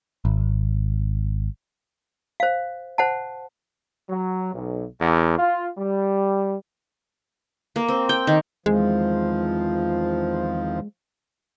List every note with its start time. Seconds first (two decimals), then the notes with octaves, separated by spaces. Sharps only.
0.25 G#1
2.40 C5 F5
2.98 C5 F#5 A5
4.10 F#3
4.54 B1
5.00 E2
5.39 F4
5.78 G3
7.76 A#3
7.89 C4
8.09 G5
8.27 D#3
8.66 E2 D#3 F3 G#3 C4